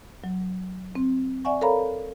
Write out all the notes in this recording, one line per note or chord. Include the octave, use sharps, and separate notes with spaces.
F#3
C4
D5 E5 F#5 G#5 C#6
A4 A#4 C#5 F5 A#5 B5